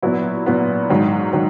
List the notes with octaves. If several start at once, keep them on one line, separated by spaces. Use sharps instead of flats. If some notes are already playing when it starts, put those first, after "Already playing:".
A#2 F#3 B3 E4
A#2 F#3 B3 E4
G#2 D#3 F#3
D#3 F#3